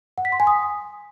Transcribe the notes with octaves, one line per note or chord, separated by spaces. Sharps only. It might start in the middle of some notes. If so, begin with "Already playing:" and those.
F#5
B6
C6
G#5
D#6